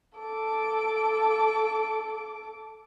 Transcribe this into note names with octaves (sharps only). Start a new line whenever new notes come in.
A4 D6